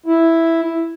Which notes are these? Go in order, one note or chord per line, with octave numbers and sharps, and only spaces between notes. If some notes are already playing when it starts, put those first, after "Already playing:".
E4